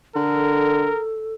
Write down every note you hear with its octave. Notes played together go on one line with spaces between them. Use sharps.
D3 A4 A#4